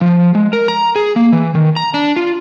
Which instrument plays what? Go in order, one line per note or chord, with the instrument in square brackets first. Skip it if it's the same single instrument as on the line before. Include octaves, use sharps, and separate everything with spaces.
[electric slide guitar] F3
G#3
A#4
A#5
G#4
A#3
E3
D#3
A#5
D4
F4